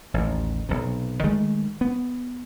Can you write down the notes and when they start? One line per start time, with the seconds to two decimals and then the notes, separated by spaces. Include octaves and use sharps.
0.14 A1 D#2
0.69 B1 C3
1.24 D#3 G#3 A3
1.81 B3